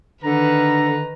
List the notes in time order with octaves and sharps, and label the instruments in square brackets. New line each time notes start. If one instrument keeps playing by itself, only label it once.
[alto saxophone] D3 [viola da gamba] D#3 B4 [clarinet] A#5